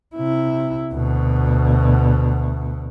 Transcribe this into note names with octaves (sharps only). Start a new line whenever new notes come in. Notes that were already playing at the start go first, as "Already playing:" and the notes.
C3 E4
D2 B2